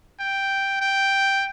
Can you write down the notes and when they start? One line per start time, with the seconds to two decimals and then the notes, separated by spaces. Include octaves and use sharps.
0.20 G5
0.81 G5